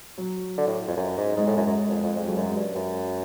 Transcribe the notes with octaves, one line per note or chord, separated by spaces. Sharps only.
F#3
D3
A2
F2
F#2
G#2
G#2 G#3
A2
F#2
F#2
F2
F2
F2 G#3
F#3
F#2
G#3
G2
F#2